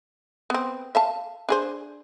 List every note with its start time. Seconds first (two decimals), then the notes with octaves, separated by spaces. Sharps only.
0.50 B3 C4
0.95 E5 F5 A5
1.49 D4 G#4 C5